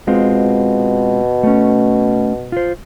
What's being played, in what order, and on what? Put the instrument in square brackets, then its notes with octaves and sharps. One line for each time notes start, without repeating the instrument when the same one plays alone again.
[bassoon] B2 [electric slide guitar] G#3 C4 F4
[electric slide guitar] A3 C#4
F4 C5